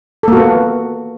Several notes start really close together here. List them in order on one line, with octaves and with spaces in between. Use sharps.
A4 A#3 F#4 B3